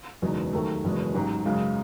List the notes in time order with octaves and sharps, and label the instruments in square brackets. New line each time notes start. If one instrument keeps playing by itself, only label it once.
[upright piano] F#1 E2 B2 G#3 D#4
D#2 D#3 F#3 A3
F#1 E2 B2 G#3
A1 G#2 F#3
F#2 C#3 G#3